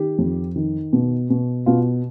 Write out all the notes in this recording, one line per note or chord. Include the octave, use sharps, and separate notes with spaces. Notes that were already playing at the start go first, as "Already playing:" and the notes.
Already playing: D#3 G4
F2
D#3
B2
B2
B2 F4